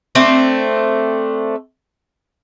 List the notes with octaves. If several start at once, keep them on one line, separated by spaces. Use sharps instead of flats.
A3 C4 D4